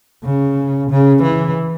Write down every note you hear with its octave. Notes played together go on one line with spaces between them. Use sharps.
C#3
C#3
E3